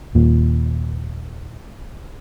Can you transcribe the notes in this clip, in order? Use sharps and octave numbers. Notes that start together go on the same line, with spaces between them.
D#1 A#2